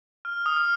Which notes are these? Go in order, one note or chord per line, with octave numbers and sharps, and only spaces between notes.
F6
D#6
F6